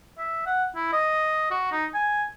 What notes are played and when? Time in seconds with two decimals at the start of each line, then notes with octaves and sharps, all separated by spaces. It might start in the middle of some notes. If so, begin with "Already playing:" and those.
0.18 E5
0.46 F#5
0.75 E4
0.92 D#5
1.51 F#4
1.72 D#4
1.94 G#5